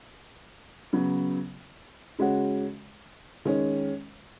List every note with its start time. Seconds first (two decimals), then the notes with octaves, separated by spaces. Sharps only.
0.93 C#3 F#3 B3
2.19 C#3 G#3 C#4 F#4
3.45 D#3 G#3 C#4